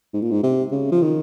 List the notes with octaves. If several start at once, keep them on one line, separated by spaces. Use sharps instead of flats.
G#2
A#2
G#2
C3
C#3
F3
D#3